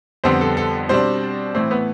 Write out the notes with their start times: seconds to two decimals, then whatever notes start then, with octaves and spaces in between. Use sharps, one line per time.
0.24 F2 D3 G3 B3 C4 C5
0.41 A4
0.57 A4
0.89 B2 G3 C4 D4 C5
1.55 A2 E3 A3 C4 C5
1.71 B3 B4